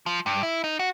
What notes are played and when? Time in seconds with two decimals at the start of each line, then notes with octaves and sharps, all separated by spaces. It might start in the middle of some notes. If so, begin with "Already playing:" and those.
0.06 F3
0.26 G2
0.43 E4
0.64 D#4
0.79 F#4